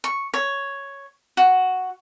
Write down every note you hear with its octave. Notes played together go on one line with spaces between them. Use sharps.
C#6
C#5
F#4